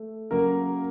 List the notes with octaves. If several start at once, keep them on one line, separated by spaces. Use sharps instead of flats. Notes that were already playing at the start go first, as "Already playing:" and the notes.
Already playing: A3
C#3 F#3 A#3 A#4